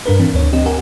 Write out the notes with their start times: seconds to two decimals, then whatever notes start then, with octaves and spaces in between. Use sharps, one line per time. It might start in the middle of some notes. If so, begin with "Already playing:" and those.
0.06 G2 D4 A#4 B4
0.20 E3 C4 D4
0.34 D2 C#5
0.53 C4 G4 D#5
0.65 G4 A#4 F#5 G#5